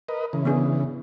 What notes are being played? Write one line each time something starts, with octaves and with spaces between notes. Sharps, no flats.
A#4 B4 D#5
C#3 E3
B3 D4 G#4